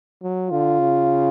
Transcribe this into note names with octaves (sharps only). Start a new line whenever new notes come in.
F#3
D3 F4
C#3